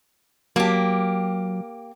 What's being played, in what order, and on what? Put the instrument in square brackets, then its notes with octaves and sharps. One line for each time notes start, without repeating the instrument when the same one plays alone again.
[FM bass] F#3 [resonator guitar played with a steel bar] A#3 G4